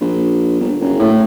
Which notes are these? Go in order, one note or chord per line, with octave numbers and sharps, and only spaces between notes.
A#1
G1
F#1
A2